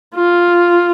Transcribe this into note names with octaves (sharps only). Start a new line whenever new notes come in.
F4